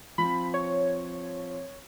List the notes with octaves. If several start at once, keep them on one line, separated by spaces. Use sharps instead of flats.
F3 C4 B5
C#5